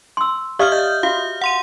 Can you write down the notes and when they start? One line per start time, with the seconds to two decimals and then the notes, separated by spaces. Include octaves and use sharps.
0.17 C6 E6
0.59 G4 D5 E5 F5 D#6 F6
0.72 D#5 G6
1.03 F4 F#4 F5
1.42 F#5 C6 D#7